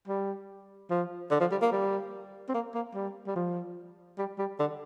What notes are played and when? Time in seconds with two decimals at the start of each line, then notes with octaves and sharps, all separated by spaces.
0.08 G3
0.90 F3
1.31 D3
1.40 F3
1.51 G3
1.62 A#3
1.72 G3
2.49 C4
2.54 A#3
2.74 A#3
2.95 G3
3.27 G3
3.36 F3
4.18 G3
4.39 G3
4.60 D3